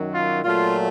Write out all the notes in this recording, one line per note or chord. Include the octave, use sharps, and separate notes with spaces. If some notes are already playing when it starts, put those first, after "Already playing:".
Already playing: F#2 D#3 F#3
F4
A#2 F#3 A3 F4